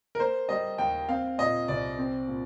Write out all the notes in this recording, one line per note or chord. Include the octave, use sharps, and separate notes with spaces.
A#4
A#3 C5
G3 D#5
D#2 G5
C4 F5
A#2 D#5
C2 D5
C4
A#2